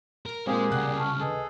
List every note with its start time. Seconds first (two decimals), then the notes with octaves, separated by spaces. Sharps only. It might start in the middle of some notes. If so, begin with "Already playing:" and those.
0.26 A#4
0.47 A#2 G#3 A#3 C4 G4 G#4
0.72 C2 C#3 D5 F#5 G5 F#6
0.97 A5 C#6 F6
1.20 G#4 A4 B4 D#5